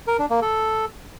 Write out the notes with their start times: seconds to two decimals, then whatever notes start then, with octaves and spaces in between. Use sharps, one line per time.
0.07 A#4
0.19 D4
0.30 A#3
0.42 A4